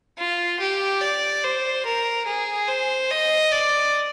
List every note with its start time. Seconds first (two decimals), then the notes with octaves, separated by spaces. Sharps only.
0.18 F4
0.59 G4
1.01 D5
1.43 C5
1.85 A#4
2.26 G#4
2.68 C5
3.10 D#5
3.52 D5